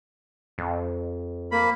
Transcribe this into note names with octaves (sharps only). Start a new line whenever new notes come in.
F2
A#3 B5